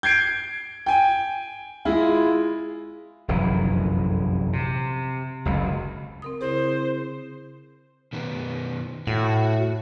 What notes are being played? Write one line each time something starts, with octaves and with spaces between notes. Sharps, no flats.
G6 G#6 C7 D7
G5 G#5
G#3 E4 F4
F1 A#1 F#2 E3
C3
F#1 C#2
C4 A#4 D#6
C#3 E4 G#4 C5
B2 D#3 B3
A2 F#4